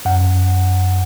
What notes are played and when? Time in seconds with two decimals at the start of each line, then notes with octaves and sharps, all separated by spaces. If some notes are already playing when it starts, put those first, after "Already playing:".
0.05 F#2 F#5